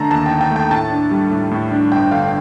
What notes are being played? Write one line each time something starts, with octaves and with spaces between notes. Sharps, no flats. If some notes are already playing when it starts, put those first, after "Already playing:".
Already playing: D3 A3 D#4 A5 A#5
D#2 A5
G5
D#4
G5
A3
G5
A2 A5
D4
G3
A2
A2
D4
G1 G5
D3 F5